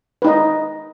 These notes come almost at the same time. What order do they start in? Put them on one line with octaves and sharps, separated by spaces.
B4 D#4 D#5